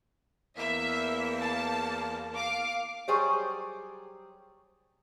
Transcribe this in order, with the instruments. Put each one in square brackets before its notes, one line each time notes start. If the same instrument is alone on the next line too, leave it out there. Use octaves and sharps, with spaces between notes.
[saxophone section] E2 A#3 [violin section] E5
[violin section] A5
F5 D6
[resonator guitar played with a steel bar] F#3 G3 G#4 C5 C#5